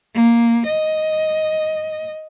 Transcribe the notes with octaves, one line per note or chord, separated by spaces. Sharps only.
A#3
D#5